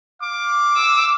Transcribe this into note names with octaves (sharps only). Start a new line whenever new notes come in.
F5 D6
E6